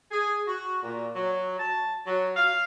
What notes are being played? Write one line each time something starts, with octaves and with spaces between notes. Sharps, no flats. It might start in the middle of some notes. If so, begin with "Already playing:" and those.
G#4
F#4
A#2
F#3
A5
F#3
F5